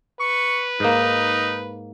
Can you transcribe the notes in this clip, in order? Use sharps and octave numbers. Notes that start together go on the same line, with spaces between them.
B4 C#6
G#2 A#3 D#4